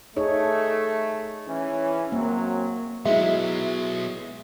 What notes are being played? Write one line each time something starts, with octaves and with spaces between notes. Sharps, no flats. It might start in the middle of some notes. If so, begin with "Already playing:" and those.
A3 D#4 G#4 C#5
E3 C#4
F#2 F#3 A#3 C4
F#3 G#3 B3 E4 E5